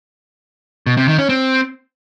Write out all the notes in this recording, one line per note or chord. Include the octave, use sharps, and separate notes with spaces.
B2
C3
D#3
C#4
C4